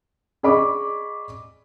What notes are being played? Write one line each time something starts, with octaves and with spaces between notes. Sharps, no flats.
G#4 D5 D#5 B5 C#6 D6